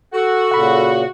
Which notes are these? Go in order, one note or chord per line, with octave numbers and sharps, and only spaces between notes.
F#4 A4
A#2 C#3 F#5 B5